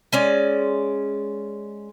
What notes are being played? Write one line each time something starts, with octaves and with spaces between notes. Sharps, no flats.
G#3 C#4 D5